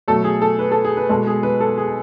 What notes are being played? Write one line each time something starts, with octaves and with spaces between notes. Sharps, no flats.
B2 F#3 A3 A4
G#4
A4
B4
A4
G#4
B4
B2 G#3 B3 A4
G#4
B4
A4
G#4